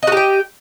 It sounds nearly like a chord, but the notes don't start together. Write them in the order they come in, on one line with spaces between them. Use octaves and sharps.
D#5 F#4 G4 G5